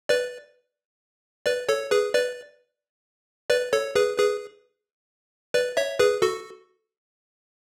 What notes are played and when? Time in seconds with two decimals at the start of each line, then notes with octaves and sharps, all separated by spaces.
0.09 B4 D5
1.46 B4 D5
1.69 A4 C#5
1.91 G#4 B4
2.14 B4 D5
3.50 B4 D5
3.73 A4 C#5
3.95 G#4 B4
4.18 G#4 B4
5.54 B4 D5
5.77 C#5 E5
5.99 G#4 B4
6.22 F#4 A4